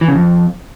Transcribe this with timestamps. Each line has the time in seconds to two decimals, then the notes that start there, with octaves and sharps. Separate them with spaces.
0.01 E3
0.08 C#3
0.15 F2